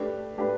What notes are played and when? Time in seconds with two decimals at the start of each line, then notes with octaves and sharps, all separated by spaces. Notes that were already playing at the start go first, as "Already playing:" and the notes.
Already playing: A3 D4 G4 B4
0.37 A3 D4 G4 B4